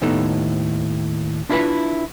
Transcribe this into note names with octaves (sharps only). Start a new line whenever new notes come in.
D#2 A2 B3 D#4 A4
D4 E4 F4 A#4 B4 E5